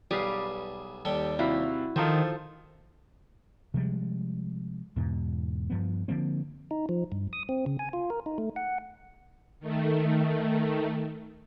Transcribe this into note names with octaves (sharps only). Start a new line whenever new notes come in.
B1 G3 G#4 B4 F5
D#2 G3 A4 G5
C3 C4 E4 F#4 F5 B5
D#3 F3 F4 A4 C5
C3 F3 G3 G#3
E2 G#2 B2
G2 F3 B3
D3 F3 A#3 C4
D#4
F3
G2
D#6
C4
C#3
G#5
F4
A#4
D#4
A3
F#5
D#3 A3